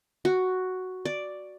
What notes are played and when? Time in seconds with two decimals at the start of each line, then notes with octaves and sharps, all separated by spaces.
0.25 F#4
1.05 D5